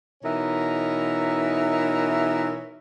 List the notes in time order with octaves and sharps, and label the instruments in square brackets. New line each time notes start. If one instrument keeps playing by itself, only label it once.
[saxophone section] B2 E3 D#4 A#4 C#5 E5